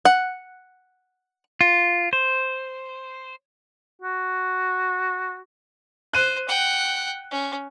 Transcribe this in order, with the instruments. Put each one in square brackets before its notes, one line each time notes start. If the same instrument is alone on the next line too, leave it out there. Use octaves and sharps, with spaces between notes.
[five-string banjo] F#5
[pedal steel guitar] F4
C5
[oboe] F#4
[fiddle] C5 [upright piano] F#6 D#7
[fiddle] F#5 G5
C#4